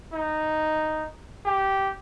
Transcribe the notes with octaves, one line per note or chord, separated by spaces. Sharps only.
D#4
G4